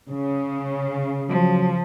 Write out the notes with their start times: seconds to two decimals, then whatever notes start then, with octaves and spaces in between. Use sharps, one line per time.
0.11 C#3
1.29 F3 F#3